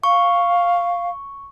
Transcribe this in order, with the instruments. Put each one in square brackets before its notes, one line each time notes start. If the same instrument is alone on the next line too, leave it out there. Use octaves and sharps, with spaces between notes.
[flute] F5 [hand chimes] C#6